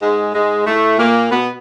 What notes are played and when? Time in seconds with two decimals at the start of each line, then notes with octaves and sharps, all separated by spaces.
0.02 G#2 G#3
0.34 G#2 G#3
0.67 A2 A3
0.99 A#2 A#3
1.31 B2 B3